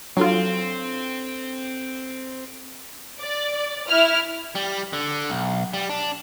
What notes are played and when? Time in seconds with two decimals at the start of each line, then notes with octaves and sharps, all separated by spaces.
0.17 F#3 C4 D4 F4 A4
3.20 D5
3.90 E4 F6
4.55 G3
4.93 D3
5.30 B1
5.74 G3
5.90 D4